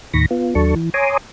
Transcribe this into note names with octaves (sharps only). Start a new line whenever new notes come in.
D#2 A2 D#3 B5 C#6 A#6
B3 F4
D#2 F#3 D4 A4 A5 C#6
E3
C#5 G#5 A#5 C6 D6 D#6